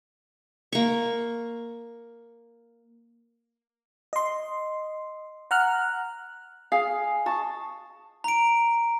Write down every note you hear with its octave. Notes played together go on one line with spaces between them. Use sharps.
A#3 C#6
D#5 C6
F#5 A#5 F6 F#6
G#4 F5
D#5 A5 C#6
A#5 D7